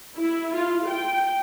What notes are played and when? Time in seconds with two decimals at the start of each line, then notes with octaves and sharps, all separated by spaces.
0.16 E4
0.55 F4
0.88 G5